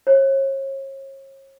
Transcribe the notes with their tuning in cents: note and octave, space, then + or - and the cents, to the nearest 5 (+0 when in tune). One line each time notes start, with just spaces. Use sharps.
C#5 -40